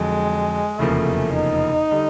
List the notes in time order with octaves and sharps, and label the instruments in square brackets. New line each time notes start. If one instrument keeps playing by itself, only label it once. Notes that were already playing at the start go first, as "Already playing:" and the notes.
Already playing: [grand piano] F2 D3 F#3 [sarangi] G#3
[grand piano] F1 E2 C#3 F3 A#3 [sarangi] A3
[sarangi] D#4
[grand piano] D3 G3